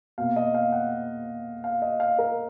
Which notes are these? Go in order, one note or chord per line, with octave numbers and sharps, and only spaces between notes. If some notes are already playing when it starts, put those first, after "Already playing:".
B2 A#3 F5
D#5
F5
F#5
F5
D#5
F5
A#4